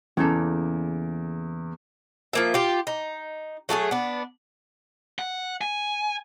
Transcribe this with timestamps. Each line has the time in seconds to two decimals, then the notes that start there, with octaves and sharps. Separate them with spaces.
0.17 E2 C#3 A#3 A4
2.33 F3 A#3 E5
2.54 F4 G4
2.87 D#4
3.69 F#3 A3 F#4 G#4
3.91 B3 D4
5.19 F#5
5.61 G#5